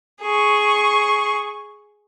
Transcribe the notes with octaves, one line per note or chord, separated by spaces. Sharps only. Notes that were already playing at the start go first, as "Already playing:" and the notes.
G#4 C#6